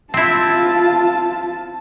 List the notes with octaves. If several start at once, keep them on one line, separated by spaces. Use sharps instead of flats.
C4 E4 F4 A5